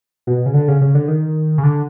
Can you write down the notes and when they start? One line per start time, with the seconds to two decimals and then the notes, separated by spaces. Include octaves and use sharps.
0.27 B2
0.46 C#3
0.54 D3
0.68 C#3
0.81 C#3
0.95 D3
1.08 D#3
1.58 C#3
1.63 D3